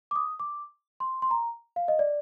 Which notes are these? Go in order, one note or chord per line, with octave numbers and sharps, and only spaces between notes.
D6
D#6
D6
C6
C6
A#5
F5
D#5
D5